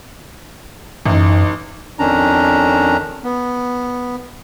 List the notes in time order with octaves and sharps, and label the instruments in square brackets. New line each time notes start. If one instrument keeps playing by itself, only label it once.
[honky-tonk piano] A1 D#4 [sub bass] F#2
[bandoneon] F2 D#3 C#4 D4 A#5
B3